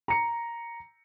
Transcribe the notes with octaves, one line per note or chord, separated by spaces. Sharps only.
A#5 C#7